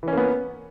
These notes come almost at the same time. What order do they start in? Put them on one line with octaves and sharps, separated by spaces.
E3 C#4 A#3 B3